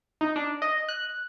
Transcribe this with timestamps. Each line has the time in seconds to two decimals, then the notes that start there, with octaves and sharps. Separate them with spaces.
0.21 D#4
0.36 D4
0.62 D#5
0.89 F#6